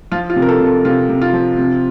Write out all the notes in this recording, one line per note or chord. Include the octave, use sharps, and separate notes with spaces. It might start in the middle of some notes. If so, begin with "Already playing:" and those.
F3 F4
F4
C3
A#4
A4
C3
A4
C3 F4
C3
F4
F3
C3